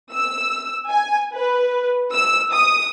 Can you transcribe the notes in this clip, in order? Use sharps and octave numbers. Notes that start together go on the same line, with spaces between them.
E6
G#5
B4
E6
D#6